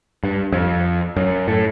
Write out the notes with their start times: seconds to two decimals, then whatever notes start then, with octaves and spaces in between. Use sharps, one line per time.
0.23 G2
0.52 F2
1.16 F#2
1.48 A2